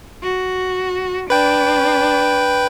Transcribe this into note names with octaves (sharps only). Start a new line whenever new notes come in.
F#4
D4 B4 G5